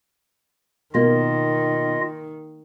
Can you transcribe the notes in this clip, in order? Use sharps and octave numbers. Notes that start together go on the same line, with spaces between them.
B2 D#3 A#3 F4 D#5